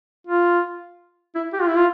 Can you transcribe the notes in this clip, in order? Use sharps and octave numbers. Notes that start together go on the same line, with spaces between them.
F4
E4
G4
F4
E4
F4